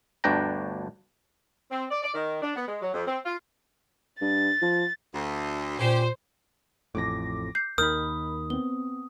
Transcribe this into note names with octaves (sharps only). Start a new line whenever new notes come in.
G1 D2 D4 B4 G5 A#5
C4
D5
D5
D#3
D4
B3
G#3
F#3
F2
C4
F4
G2 A6
F3
D2
A#2 C#4 G4 C5
A1 F2 A2 D6 A#6
G6 C7
D#2 D#3 A#4 B5 D#6 F6 G6
B3 C4 G7